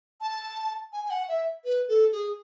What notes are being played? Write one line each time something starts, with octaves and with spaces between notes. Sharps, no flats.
A5
G#5
G#5
F#5
E5
B4
A4
G#4